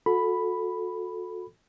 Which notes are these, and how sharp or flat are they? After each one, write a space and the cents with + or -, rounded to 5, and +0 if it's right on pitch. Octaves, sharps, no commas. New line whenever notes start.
F#4 -35 A4 +0 B5 +0